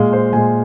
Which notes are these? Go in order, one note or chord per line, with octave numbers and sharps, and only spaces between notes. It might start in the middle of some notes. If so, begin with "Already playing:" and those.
Already playing: A#2 G#3 F5
C5
A#2 G#3 G#5